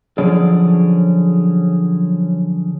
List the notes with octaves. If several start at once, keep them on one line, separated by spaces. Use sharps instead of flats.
D3 F3 F#3 C#4 G#4 D5